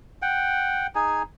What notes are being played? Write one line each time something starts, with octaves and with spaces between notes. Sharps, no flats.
F#5 G5
D#4 G#4 G#5